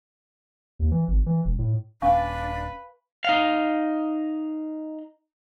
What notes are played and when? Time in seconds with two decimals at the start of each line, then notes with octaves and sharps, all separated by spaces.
0.79 D#2
0.91 E3
1.08 G#1
1.26 E3
1.45 E1
1.59 A2
2.02 D#1 C#4 D4 B4 F5 G#5 C#6
3.25 D#4 F5